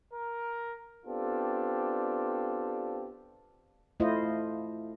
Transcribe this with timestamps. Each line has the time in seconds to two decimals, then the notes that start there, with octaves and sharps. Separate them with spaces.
0.12 A#4
1.06 B3 C4 D4 F4 G4 A4
4.00 A3 E4 F4 C5 D#5